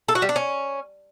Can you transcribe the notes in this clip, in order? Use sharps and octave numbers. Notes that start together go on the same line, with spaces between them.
A4
F#4
G3
D4
C#4